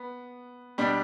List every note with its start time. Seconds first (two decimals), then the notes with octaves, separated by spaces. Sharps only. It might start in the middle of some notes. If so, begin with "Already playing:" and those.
Already playing: B3
0.78 B2 G3 D4